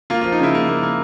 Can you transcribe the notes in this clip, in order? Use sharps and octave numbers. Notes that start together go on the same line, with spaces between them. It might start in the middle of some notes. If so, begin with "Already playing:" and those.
A#3 F4
F3 F4
D#4
C#3 E4
A#3
A#3
A#3